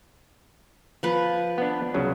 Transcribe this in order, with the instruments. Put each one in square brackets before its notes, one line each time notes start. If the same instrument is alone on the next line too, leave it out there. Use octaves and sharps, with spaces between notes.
[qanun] F3 B4
[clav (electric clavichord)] B3 D4
C2 C#3 F#3